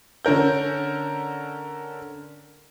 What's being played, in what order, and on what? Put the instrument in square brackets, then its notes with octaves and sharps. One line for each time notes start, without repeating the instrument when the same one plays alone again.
[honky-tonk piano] D3 C#4 A#4 G6